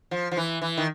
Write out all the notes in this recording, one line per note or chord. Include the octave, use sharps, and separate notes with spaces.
F3
F3
E3
E3
D#3